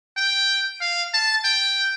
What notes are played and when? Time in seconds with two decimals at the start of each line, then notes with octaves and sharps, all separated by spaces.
0.17 G5
0.81 F5
1.14 A5
1.45 G5